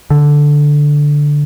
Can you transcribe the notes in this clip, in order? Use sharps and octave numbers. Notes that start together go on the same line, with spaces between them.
D3